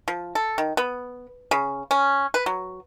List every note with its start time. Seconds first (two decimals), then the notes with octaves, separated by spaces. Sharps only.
0.08 F3
0.35 A4
0.58 D#3
0.77 B3
1.51 C#3
1.91 C#4
2.34 B4
2.46 F#3